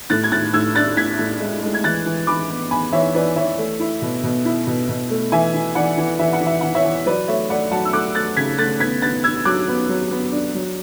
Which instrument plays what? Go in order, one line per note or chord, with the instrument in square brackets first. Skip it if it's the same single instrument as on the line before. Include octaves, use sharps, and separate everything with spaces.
[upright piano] A2 F#6 A6
G#6
A2 F#6 A6
A2 E6 G#6
D4 F#6 A6
A2 G#6 B6
A2
G#3
G#3
G#6
E3 F#6 A6
E3
E3 B5 D6
B3
B3 G#5 B5
E3 C#5 E5
E3 B4 D5
E3 C#5 E5
A3
E4
B2
B2
E4
B2
B2
A3
E3 E5 G#5
E3
E3 D5 F#5
E3
E3 E5
F#5
E3
E5
E3 F#5
C#5 E5
E3
F#3 B4 D5
A3 C#5 E5
A3 D5 F#5
F#3 F#5 A5
E6
A3 D6 F#6
A3 F#6 A6
C#3 G#6 B6
A3 F#6 A6
B3 G#6 B6
B3 F#6 A6
B3 E6 G#6
F#3 D6 F#6
B3
F#3
B3
D4
F#3